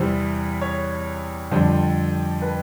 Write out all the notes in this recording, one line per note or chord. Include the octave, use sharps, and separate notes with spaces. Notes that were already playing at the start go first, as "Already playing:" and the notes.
Already playing: E2 C3 E3 G3 C5
C#5
F2 D3 G3 C5
B4